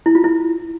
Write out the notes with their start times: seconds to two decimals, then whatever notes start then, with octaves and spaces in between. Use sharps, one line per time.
0.06 E4
0.15 F4
0.24 E4